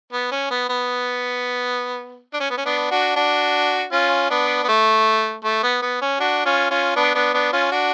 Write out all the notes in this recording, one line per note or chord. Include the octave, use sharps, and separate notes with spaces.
B3
C#4
B3
B3
D4
C#4
B3
C#4
B3 D4
D4 F#4
D4 F#4
C#4 F4
B3 D4
B3
A3
A3
B3
B3
C#4
D4 F#4
C#4 F4
C#4 F4
B3 D4
B3 D4
B3 D4
C#4 F4
D4 F#4